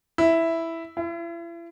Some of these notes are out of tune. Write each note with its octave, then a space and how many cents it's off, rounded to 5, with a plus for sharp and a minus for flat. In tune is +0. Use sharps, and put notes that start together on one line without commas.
E4 +0
E4 +40